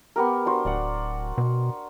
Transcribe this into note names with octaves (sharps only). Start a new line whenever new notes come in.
B3 G4 A#4
D4 F#4 C5
D1 D5 F#5
B2